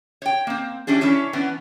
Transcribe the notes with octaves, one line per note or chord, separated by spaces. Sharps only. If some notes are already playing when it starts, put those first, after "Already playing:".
C#5 G5
A#3 C4
E3 G3 C#4 D4 G#4
C#4 D4 E4 C#5
E3 B3 C#4 D4